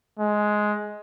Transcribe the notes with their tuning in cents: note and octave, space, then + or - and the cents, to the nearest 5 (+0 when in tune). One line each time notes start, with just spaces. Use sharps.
G#3 +10